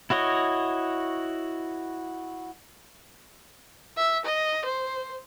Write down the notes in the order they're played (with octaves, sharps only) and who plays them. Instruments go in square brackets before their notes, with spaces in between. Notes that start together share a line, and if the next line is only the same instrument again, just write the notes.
[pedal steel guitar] E4 F#4 C#5 D#5
[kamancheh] E5
D#5
C5